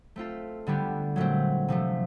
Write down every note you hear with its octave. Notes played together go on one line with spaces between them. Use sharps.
A3 C4 F4 A4
D3 G3 B3 D4 G4
A#2 F#3 A3 C4
C3 F3 A3